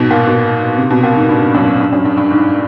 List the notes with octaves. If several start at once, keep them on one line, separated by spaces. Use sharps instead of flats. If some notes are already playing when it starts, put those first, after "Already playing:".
Already playing: G#2 B2
A#2
B2
C3
B2
A#2
G#2
G2
F#2
G2
F#2
G2
G2
G#2